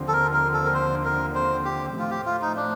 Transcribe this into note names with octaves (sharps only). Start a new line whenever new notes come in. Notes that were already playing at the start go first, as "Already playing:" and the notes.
Already playing: D#2 D3 F3 C4
A4
A#4
A#4
A4
A#4
C5
A#4
C5
G4
A2 F3 A3 C4 F4
G4
F4
D#4
D4